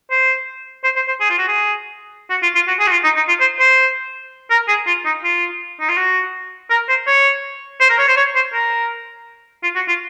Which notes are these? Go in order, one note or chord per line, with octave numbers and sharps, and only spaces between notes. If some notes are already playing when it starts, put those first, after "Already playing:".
C5
C5
C5
C5
G#4
F4
F#4
G#4
F#4
F4
F4
F#4
G#4
F#4
F4
D#4
D#4
F4
C5
C5
A#4
G#4
F4
D#4
F4
D#4
F4
F#4
A#4
C5
C#5
C5
A#4
C#5
C5
C#5
C5
A#4
F4
F#4
F4